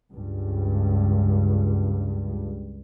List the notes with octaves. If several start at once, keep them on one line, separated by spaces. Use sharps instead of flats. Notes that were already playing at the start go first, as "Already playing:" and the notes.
C#2 G2